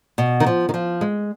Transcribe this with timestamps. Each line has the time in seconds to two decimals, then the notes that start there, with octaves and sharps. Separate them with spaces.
0.18 B2
0.40 D#3
0.47 F3
0.69 D#3
0.74 F3
1.01 G#3